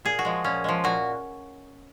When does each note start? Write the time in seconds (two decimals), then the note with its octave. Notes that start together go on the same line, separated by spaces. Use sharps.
0.05 A#2 G#4
0.19 F#4
0.25 F3 G#3
0.44 A#2 C#4
0.64 F3 G#3
0.84 A#2 F#4